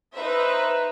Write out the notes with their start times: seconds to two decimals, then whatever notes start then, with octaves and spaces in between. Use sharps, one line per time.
0.13 D#4 B4 C5 E5